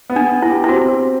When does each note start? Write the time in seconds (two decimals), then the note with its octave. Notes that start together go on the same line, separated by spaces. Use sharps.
0.10 B3
0.16 D4
0.29 B3
0.42 E4
0.49 G4
0.64 E4
0.69 C4 F#4
0.89 C4